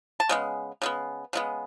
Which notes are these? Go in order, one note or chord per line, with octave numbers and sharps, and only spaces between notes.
A5
C#3 G#3 B3
C#3 G#3 B3
C#3 G#3 B3